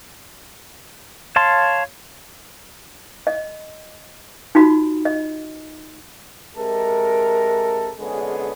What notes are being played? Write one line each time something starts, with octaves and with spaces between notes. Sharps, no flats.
C#5 F5 A5 C6
D#5
D#4 F4 F#4 B5
D#5
C3 G#3 A4 A#4
A#1 D3 G#3 B3 C#4 G#4